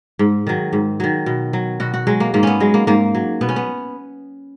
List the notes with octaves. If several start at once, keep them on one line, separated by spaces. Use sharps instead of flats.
G#2
D#3 F#3
G#2
D#3 F#3
B2
F#3
B2 F#4
F#4
F#3 G#3
A#3
G#2 A#3
B3 C#4
F#3 G#3
A#3
G#2 A#3
F#3
B2 B3
C#4
B3